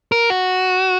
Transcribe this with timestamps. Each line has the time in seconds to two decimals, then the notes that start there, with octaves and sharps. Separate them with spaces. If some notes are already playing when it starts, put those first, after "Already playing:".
0.12 A#4
0.30 F#4